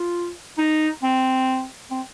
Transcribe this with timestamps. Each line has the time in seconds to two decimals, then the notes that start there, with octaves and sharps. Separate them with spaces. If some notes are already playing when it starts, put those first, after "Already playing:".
Already playing: F4
0.58 D#4
1.03 C4
1.91 C4